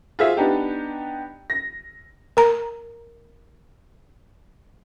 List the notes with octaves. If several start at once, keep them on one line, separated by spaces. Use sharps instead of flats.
F4 F#4 G#4 C5 E5
B3 D4 D#4 G4
A#6
A#4 A#5